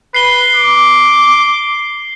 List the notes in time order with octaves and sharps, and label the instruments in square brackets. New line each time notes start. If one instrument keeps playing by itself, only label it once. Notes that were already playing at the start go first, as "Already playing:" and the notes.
[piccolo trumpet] B4 [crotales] C7 G7
[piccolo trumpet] D6